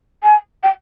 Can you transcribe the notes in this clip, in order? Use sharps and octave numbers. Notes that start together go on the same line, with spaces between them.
G#5
G5